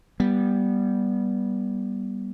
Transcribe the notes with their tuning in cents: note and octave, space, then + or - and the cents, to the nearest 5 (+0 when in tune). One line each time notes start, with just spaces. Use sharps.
G3 +0 B3 -20